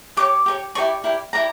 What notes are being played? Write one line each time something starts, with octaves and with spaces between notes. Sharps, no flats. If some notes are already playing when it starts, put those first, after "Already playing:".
G4 A#4 C#5 D6
G4 A#4 C#5
E4 G4 A#4 D5 C#6
E4 G4 A#4 D5
E4 G4 A#4 D5 A#5